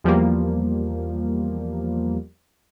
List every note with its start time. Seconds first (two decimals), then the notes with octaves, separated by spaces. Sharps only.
0.04 E2 F3 G3 A#3